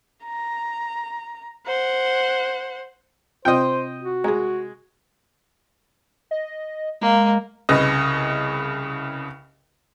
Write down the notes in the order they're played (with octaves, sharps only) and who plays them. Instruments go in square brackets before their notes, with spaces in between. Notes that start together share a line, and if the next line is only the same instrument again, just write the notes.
[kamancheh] A#5
C5 F#5
[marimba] C3 C4 F4 [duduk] C5 [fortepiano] D#5 G5
[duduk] F#4
[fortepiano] G#3 [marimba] G#4 A#5
[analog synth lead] D#5
[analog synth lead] G#3 [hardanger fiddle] A#3
[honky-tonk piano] C2 C#3 B4 D#5